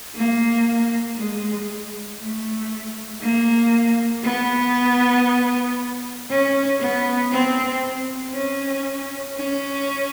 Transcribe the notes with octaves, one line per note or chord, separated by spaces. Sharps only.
A#3
G#3
A3
A#3
B3
C#4
B3
C4
C#4
C#4